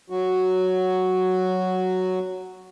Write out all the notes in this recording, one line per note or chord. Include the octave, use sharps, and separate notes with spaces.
F#3 F#4